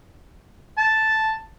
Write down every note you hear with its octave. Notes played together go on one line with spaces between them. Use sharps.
A5